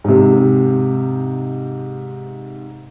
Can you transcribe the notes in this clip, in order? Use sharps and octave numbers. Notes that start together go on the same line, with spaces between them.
G#2 C3